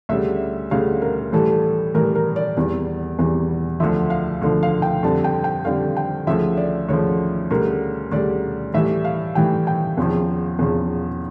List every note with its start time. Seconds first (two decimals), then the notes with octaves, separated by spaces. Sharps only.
0.09 D2 C#3 G3 E5
0.71 D2 C#3 G3 F5
1.02 A#4
1.32 A2 E3 G3 A4
1.94 A2 E3 G3 A#4
2.15 A#4
2.36 D5
2.57 E2 E3 G3
3.19 E2 E3 G3
3.80 D2 D3 F3 E5
4.10 F5
4.42 D2 D3 F3
4.63 F5
4.82 G5
5.03 F2 D3 G3 A5
5.24 G5
5.44 G5
5.65 F2 D3 G3 F5
5.96 G5
6.27 D2 C#3 F3 E5
6.57 D5
6.88 D2 C#3 F3 C#5
7.51 D2 C#3 G3 A#4
8.12 D2 C#3 G3 D5
8.74 A2 E3 G3 E5
9.05 F5
9.35 A2 E3 G3 G5
9.67 G5
9.97 E2 C#3 F3
10.59 E2 C#3 F3